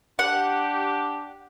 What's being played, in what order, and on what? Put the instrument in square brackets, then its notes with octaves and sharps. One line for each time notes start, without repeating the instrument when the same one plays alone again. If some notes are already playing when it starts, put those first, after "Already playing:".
[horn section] D4 G4 [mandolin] F#5